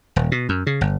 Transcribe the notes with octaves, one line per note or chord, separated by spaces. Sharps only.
D#1
B2
F#2
C#3
G1